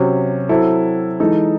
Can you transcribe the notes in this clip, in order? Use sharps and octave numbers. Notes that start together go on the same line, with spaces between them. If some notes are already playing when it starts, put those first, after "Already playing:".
Already playing: C3 F#3 C#4
F#3 C4 E4 A4
E3 G#3 D#4 A4